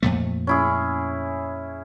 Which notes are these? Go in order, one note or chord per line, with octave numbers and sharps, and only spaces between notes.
F2 A#2 A3
C#4 E4 G#4